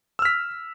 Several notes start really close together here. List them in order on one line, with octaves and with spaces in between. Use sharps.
E6 F6 B6